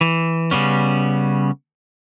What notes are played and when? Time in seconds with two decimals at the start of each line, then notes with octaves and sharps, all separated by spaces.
0.01 E3
0.51 C#3 G3 B3 C#4